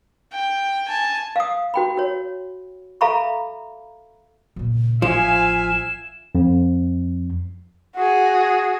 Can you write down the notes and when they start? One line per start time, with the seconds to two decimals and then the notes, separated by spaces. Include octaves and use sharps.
0.33 G5
0.88 G#5 A5
1.36 F5 D#6
1.74 F#4 G5 B5
1.97 F#4 C#5
3.01 A4 E5 F5 A#5 B5 C#6
4.56 A#2 C#3
5.02 A1 F3 E5 F5 G#5 E7
6.35 F2
7.96 F#4 G#4